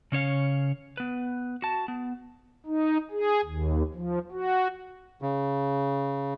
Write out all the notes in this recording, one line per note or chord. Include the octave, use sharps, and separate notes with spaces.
C#3 C#4 C#5 F5
B3 B4
F#4 A5
B3
D#4
G#4
D#2
F3
F#4
C#3